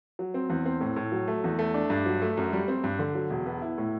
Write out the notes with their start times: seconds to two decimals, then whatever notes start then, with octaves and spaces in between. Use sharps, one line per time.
0.19 F#3
0.34 C4
0.50 E2
0.66 C4
0.81 A2
0.96 A2
1.12 F#3
1.28 A3
1.44 E2
1.59 A3
1.74 D4
1.90 G2
2.06 F#3
2.22 A3
2.37 F#2
2.53 G3
2.68 C4
2.84 G2
2.99 D3
3.15 F#3
3.30 E1
3.46 B3
3.62 E4
3.78 A2